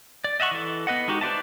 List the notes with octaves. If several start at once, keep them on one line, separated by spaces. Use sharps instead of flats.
D5
D#5 E5 F#5 C#6
E3 A4
B3 B4 D#5 F#5
G#3 D#4 F#4 G4
B4 C5 D5 E5 A5